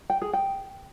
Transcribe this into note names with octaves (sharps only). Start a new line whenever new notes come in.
G5
G#4
G5